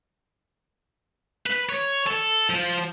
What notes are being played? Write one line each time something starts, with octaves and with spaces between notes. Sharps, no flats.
B4
C#5
A4
F3